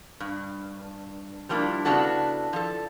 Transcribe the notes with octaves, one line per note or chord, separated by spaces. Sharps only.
G2
F3 G3 A#3 D4 E4
C#3 B3 D4 E4 F#4 A4
F3 A4